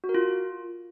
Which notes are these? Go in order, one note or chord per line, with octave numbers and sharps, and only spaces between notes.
F#4
A#4
F4